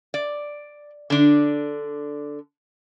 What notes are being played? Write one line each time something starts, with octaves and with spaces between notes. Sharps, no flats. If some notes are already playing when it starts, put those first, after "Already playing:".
D5
D3 D4